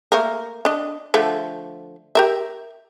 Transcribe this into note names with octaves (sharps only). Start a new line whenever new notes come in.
A3 A#3 A#4
D4 D#5
D3 F3 A3
G4 A#4 E5